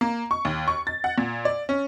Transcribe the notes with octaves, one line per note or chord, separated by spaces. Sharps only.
A#3
C#6
D#2
C#6
A6
F#5
A#2
D5
C#4